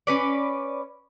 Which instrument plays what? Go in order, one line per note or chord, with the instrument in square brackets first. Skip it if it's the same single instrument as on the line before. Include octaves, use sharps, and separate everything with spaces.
[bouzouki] C#4 B4 D5